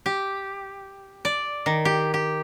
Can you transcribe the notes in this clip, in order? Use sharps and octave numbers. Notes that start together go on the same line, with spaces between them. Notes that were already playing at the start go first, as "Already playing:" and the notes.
G4
D5
D#3
G4
G4